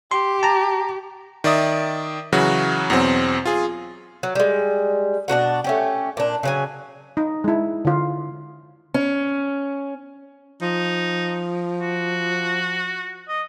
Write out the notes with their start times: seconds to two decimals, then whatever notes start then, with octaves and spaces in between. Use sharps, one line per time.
0.11 G4 C6
0.43 A5 A#5
1.44 D#3 D5 E5 D#6
2.32 C#3 E3 F#3 F#4
2.90 E2 B2 F#3 C4
3.45 F4 G#4
4.23 F#3
4.35 G3 G#3
5.28 B2 D4 F#4 F#5
5.64 A3 C#4 G4
6.17 A#2 D4
6.43 C#3 F#3 G#5
7.17 D#4
7.44 G#3 E4
7.85 D3 F4
8.94 C#4
10.62 F3 D#4
11.81 F#4
13.28 D#5